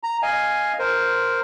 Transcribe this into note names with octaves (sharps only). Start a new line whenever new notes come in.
A#5
D#5 F5 G#5
A#4 C5